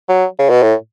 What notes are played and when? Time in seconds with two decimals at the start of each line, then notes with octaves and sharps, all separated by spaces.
0.09 F#3
0.39 C#3
0.50 B2
0.62 A2